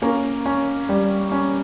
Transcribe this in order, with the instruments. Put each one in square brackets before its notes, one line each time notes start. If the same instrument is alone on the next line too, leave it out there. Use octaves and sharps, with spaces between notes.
[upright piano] A#3 [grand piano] C#4
[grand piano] C#4
G3
C#4